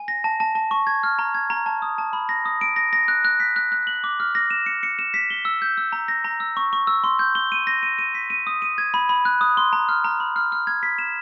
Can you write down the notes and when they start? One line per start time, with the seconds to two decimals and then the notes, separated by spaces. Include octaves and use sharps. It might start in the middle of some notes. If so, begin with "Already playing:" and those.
Already playing: G#5
0.08 A#6
0.24 A5
0.40 A5
0.55 A5
0.71 C#6
0.87 G#6
1.03 F6
1.19 A#5
1.35 G#6
1.50 A#5
1.66 A5
1.82 D#6
1.98 A5
2.13 B5
2.29 A#6
2.45 D#6
2.61 D7
2.76 A#6
2.93 A#6
3.08 F#6
3.25 F#6
3.40 B6
3.56 F#6
3.72 F#6
3.87 F#7
4.04 D6
4.20 F6
4.35 A#6
4.51 E7
4.66 C#7
4.83 C#7
4.99 E7
5.14 B6
5.30 G7
5.45 E6
5.62 G6
5.77 E6
5.92 A#5
6.08 A#6
6.24 A#5
6.40 E6
6.57 C#6
6.73 C#6
6.87 E6
7.04 C6
7.19 G6
7.35 G7
7.52 D#7
7.67 A#6
7.83 D#7
7.99 D#7
8.15 B6
8.30 D#7
8.47 D#6
8.62 D#7
8.78 G#6
8.94 B5
9.09 B5
9.25 F#6
9.41 D#6
9.57 C6
9.73 A#5
9.89 F6
10.04 A#5
10.20 B5
10.36 F6
10.52 F6
10.67 G#6
10.83 B6
10.99 E7